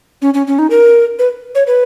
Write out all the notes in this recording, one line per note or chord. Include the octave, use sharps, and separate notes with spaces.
C#4
C#4
C#4
D#4
A#4
B4
C#5
B4